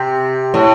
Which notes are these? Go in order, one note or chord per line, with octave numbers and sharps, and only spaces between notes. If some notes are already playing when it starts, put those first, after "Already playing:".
Already playing: C3
A2